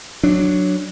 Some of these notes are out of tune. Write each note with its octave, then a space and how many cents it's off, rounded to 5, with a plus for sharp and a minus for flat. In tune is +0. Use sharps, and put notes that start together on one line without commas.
F#3 +0 D4 +0